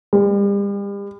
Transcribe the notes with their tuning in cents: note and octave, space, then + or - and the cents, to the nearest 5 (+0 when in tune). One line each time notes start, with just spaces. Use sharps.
G3 +40